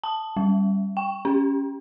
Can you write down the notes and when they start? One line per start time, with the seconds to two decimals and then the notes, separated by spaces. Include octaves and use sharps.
0.04 A5
0.37 G3
0.97 G5
1.25 C#4